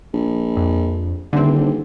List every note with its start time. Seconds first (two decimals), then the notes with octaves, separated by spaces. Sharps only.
0.14 A#1
0.57 F2
1.33 D#1 D3 E3 C4